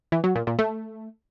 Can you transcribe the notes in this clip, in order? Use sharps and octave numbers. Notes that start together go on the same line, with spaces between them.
E3
F#3
A#2
A#2
A3